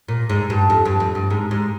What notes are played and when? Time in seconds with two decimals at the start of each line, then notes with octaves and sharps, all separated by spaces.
0.08 A#2
0.30 G#2
0.50 G2
0.70 F2
0.86 G2
1.00 F2
1.15 G2
1.31 G#2
1.51 G#2